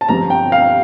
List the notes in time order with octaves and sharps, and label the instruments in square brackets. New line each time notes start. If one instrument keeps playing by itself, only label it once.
[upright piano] A5
[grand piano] G1 G2 F3 C4 [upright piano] A#5
[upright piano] G5
F5